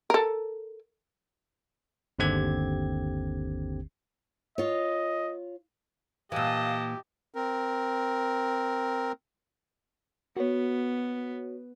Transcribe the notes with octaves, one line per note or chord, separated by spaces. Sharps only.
A4 A#4
G1 D#2 D3 C4 G4 G#6
F4 C#5 D#5
A#2 E3 G4 D#5 F5 A5
C4 A#4
B3 F#4 C#5